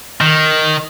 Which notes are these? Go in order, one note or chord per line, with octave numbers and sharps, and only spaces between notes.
D#3